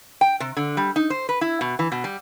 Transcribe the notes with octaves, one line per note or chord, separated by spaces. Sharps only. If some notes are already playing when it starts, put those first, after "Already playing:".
G5
C3
D3
G3
D#4
C5
B4
E4
B2
E3
B2
G3